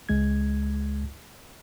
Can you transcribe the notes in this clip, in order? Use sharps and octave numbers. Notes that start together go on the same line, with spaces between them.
C#2 G#3 G#6